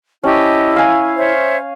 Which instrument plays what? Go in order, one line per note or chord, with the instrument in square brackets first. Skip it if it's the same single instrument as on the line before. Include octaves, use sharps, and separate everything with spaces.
[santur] C#4 [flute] E4 [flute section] G4 D#5 A5
[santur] F5 G#5
[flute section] C5 C#5 E5